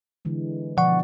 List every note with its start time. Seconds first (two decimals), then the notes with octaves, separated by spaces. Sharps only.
0.25 D3 E3 G#3
0.77 B2 D3 F3 D5 F#5 C#6